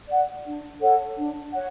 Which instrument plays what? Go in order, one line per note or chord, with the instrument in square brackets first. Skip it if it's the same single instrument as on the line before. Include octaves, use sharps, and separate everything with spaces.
[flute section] D5 F#5
D4
A4 C#5 F#5
D4
C#5 F#5